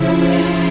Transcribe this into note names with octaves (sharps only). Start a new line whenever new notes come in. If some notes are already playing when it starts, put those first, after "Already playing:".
Already playing: C#3 F3 E4
F4